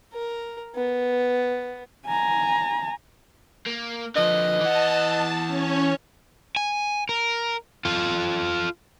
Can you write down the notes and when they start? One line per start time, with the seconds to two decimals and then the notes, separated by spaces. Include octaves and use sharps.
0.13 A#4
0.75 B3
2.06 G#5 A#5
3.67 A#3
4.15 D3 F3 B4 D#5
4.61 E3 F#5 A5
5.47 C#4 C#5
6.56 G#5
7.09 A#4
7.85 F4 A4